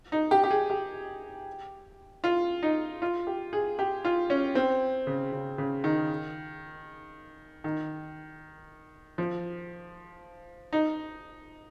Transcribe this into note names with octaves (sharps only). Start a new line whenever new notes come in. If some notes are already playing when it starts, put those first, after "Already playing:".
D#4
G4
G4
G#4
G4
F4
D#4
F4
G4
G#4
G4
F4
C#4
C4
C#3
C#3
C#3
D#3
D#3
F3
D#4